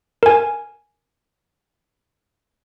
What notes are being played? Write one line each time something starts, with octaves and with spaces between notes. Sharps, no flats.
A#4 G#5